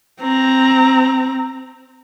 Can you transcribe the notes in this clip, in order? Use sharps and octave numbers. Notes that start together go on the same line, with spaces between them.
C4 A#5